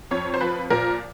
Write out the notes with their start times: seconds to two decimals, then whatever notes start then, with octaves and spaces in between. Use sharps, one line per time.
0.11 F2 C#5
0.34 C5
0.41 F3 B4
0.70 A#2 A#4